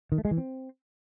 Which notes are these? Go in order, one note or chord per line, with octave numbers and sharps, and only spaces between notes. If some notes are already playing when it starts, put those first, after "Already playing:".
D#3
A3
G#3
E3
C4